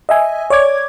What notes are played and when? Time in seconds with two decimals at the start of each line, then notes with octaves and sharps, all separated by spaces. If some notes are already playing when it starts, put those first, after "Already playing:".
0.09 D#5 E5 G#5
0.50 C#5 D5 D6 G#6